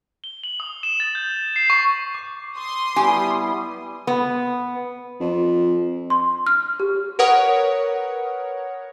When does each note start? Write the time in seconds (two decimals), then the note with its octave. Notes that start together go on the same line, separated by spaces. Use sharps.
0.24 G7
0.44 F#7
0.60 D#6
0.83 E7
1.00 A6
1.15 G6
1.56 C7
1.70 C#6
2.14 D6 C7
2.58 C6 D6 D#6
2.96 G3 B3 E4 G4 G#5 A5 D#7
4.07 B3
5.20 F2
6.10 C6
6.47 F6
6.80 G4
7.19 A#4 B4 C#5 F#5 D#6